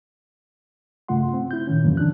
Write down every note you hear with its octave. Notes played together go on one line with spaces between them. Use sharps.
G2 C#3 A3 F4 F#5 C6
C4
E4 G6
A#2 D#3 C#4
E2 G2 D3 E3 F#3 A#3
D3 D4 F#6